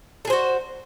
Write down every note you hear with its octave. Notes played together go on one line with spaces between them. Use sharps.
F#4 G#4 A4 C5